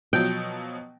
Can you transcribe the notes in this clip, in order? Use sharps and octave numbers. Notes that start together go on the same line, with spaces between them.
B2 F3 F#3 G5